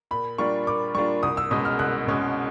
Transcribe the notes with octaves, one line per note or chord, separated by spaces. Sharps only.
A#2 B5
G3 A#3 D4 F4 C#6
A#2 D6
G3 A#3 D4 F4 C#6
C2 D#6
E6
B2 G#3 C#4 D#6
F6
C2 F#6
B2 G#3 C#4